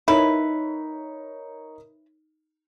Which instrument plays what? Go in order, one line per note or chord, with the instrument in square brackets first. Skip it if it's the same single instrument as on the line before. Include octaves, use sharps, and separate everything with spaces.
[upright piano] D#4 A#4 C#5 [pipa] E4 B4